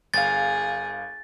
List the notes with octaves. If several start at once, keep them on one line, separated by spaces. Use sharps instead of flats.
G1 G#4 F5 A6